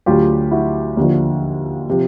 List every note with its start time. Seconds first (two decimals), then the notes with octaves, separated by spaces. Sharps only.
0.06 D2 D3 F#3 F4 G4
0.51 E4 F#4
0.97 D#2 D3 F3
1.90 C3 F3